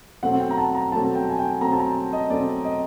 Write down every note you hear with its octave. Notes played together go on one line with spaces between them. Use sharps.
B2 F#3 A3 C4 F#5
G5
A#5
A5
A#5
B2 F#3 A3 C4 A5
G5
G#5
G5
B2 F#3 A3 C4 A#5
A5
A#5
D#5
B2 F#3 A3 C4 D5
D#5